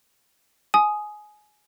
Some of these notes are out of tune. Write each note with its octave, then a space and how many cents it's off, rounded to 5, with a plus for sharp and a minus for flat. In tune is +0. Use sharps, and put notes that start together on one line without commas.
G#5 +20 D#6 +0